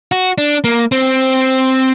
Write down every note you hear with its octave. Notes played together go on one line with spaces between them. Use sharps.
F#4
D4
A#3
C4